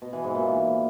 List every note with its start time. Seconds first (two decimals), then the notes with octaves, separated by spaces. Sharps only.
0.02 B2
0.13 E3
0.24 G#2
0.35 A#2